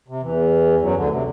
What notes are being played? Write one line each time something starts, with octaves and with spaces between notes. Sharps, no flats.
C3
E2 E3
F#2 F#3
D2 D3
C3